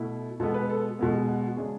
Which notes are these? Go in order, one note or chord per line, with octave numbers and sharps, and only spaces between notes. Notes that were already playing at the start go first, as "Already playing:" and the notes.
Already playing: B2 A3 E4
B2 G#3 B3 A4
B4
A4
B2 G#3 B3 A4
G#4
F#5
F#5
C#3 G#3 D4 G#4